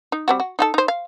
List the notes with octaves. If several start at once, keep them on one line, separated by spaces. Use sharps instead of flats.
D#4
G3 C4 F#4
F#4
D#4 F#4 A4
D#4 C5
F5